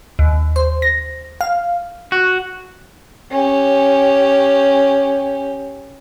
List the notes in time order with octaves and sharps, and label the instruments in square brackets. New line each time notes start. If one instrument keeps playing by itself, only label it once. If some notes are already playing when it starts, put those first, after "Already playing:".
[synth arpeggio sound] D#2
C5
A#6
F5
[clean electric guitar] F#4
[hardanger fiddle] C#4 G4